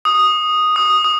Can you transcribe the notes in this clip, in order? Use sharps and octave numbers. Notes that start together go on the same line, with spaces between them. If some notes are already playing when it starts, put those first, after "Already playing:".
D#6
D#6
D#6